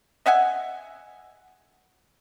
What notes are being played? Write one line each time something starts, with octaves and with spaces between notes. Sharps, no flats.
D#5 E5 F#5 G#5